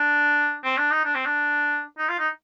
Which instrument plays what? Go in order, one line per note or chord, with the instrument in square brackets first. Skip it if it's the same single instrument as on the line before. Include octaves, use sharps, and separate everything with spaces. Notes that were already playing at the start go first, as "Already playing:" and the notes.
Already playing: [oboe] D4
C4
D4
D#4
D4
C4
D4
D#4
F4
D#4